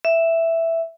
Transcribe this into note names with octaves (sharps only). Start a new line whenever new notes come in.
E5